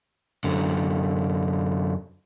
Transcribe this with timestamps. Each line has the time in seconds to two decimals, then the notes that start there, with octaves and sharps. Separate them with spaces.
0.44 F#2 D3